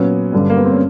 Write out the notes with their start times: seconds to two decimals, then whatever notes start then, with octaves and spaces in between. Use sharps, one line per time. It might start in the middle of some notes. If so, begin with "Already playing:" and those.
Already playing: A#2 F#3 B3 C#4
0.32 G2 D3 G3
0.50 A#3
0.57 B3
0.65 C4
0.72 C#4